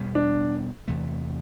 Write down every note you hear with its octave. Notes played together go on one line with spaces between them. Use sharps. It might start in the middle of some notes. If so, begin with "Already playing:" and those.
Already playing: E2 B2 G3 B3
D4
E2 C3 E3 A3